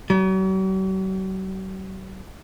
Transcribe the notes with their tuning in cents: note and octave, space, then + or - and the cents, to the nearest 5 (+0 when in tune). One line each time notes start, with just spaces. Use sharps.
F#3 +45